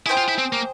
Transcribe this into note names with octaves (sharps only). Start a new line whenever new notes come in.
E4 G#4 C5 G5
F4
E4
C4
A#3